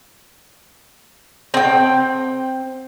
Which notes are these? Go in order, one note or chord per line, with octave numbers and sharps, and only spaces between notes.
C4 G5